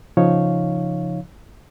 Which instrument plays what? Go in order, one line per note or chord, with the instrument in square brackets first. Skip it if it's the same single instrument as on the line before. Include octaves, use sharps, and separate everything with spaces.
[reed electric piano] C#3 F3 D#4 C#5 F5